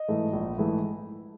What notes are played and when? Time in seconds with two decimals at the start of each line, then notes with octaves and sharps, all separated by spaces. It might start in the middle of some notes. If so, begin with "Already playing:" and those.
Already playing: D#5
0.08 G#2 E3 A3
0.33 A#1
0.57 G#2 E3 A3